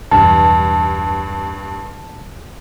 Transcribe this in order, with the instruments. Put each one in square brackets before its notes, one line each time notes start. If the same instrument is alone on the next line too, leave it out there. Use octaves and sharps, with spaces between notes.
[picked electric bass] B1 E2 [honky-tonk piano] G2 [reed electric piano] A5